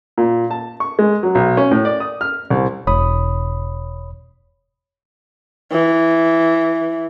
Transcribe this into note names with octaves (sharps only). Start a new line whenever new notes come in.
A#2
A5
C#6
G#3
F#3
B1
C#4
A2
D5
D#6
F6
C2
E1 C#5 B5 D#6
E3